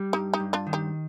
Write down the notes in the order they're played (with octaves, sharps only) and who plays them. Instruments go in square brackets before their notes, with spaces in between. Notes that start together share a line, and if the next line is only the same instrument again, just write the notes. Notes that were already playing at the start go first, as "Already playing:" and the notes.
Already playing: [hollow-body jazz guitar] G3
[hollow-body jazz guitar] G2 [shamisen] D#4 G4
[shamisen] D#4 G4
[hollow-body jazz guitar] G2
[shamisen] D4 F4
[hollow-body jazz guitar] D#3
[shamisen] D#4 G4